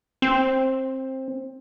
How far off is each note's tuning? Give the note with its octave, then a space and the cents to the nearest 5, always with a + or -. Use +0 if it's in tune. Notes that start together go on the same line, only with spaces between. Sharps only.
C4 +15